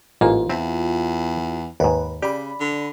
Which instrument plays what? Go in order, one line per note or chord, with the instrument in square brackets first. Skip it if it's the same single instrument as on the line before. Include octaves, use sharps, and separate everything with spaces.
[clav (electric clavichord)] A1 G#2 A#3 [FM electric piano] F4
[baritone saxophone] E2 [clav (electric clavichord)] C4 E5 A5
[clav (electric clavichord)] D#2 G#2 [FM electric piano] B4
[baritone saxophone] C#3 [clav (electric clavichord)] G4 [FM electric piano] D5 B5
[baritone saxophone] D3